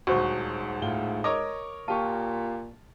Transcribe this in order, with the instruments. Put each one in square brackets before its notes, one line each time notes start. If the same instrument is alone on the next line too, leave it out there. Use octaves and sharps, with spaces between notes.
[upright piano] D#1 D2 [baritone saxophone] G#2 [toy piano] F#4 C5 C#6
[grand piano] A2 F4 G7
[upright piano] A#4 C#5 D#5 [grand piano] D6
[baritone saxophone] A#2 [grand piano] F4 G4 C#6 [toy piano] A5